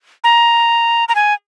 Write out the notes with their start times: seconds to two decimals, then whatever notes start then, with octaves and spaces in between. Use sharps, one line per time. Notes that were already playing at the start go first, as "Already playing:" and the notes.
0.24 A#5
1.09 A#5
1.15 G#5